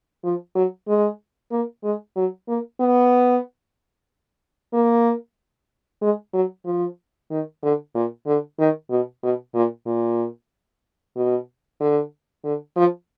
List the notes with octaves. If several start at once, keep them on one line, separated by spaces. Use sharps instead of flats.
F3
F#3
G#3
A#3
G#3
F#3
A#3
B3
A#3
G#3
F#3
F3
D#3
D3
A#2
D3
D#3
B2
B2
A#2
A#2
B2
D3
D3
F3